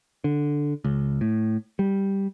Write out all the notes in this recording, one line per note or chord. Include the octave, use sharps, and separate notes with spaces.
D3
C#2
A2
G3